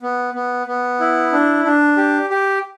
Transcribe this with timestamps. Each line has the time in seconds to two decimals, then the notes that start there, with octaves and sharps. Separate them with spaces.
0.02 B3
0.34 B3
0.67 B3
1.00 E4
1.33 D4
1.65 D4
1.97 G4
2.30 G4